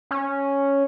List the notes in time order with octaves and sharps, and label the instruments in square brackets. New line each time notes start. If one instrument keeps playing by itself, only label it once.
[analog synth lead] C#4